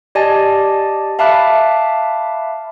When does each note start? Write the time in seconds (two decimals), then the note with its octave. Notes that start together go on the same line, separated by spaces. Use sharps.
0.15 G4 D5 D#5 G#5 A5
1.19 E5 F5 A5 B5 D6 F#6